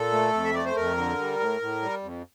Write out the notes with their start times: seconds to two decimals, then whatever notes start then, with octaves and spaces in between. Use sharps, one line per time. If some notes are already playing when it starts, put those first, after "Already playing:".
Already playing: A#2 A4
0.12 A3
0.33 F2
0.45 E5
0.54 A3 D5
0.65 C5
0.76 F2 A#4
0.97 D3
1.19 G3
1.40 A2
1.61 A2
1.82 G3
2.03 F2